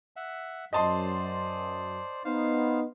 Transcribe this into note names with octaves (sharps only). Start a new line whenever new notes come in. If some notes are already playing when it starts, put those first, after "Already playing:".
E5 F#5
F#2 C5 D5 D#5 A5 C6
B3 D#4 C5 F5